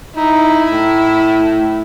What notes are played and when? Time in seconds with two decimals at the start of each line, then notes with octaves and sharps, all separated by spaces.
0.16 D#4 E4
0.69 A2